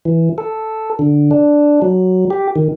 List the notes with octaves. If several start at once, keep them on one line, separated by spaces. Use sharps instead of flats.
E3
A4
D3
D4
F#3
G4
D#3